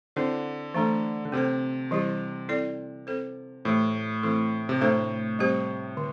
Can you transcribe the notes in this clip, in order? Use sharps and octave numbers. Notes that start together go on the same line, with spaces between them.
D3 C4 E4 C5
E3 A3 D4 A4
D3
C3 C4 A4 C5
E3 G3 E4 G4
C4 E4 A4 D5
C4 A4 C5
A2 E3 A3 E4 G4
E3 A3 C4 E4 A4
C3
A2 A3 D4 A4 C5
G3 C4 G4 C5
D3